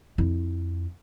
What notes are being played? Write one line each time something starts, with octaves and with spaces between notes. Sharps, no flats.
F2 E4